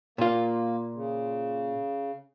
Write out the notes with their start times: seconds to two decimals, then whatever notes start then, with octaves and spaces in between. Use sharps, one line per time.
0.18 A#2 A#3 F4
0.95 C#3